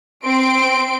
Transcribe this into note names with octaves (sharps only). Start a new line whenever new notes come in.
C4 C6 D7